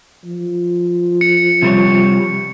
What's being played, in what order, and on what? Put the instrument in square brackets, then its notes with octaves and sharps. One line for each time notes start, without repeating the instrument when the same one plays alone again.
[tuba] F3
[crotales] C#7
[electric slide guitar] C3 G3 C#5